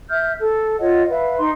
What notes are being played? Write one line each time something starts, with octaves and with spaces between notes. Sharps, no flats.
E5 F6 G6
A4
F4 C#5 D#5 F#5
B4 E5 F5
D#4 C6